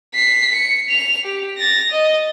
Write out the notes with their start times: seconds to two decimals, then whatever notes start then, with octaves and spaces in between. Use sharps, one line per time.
0.15 B6 C7
0.54 C#7
0.89 F7
1.24 G4
1.58 A6 A#6
1.91 D#5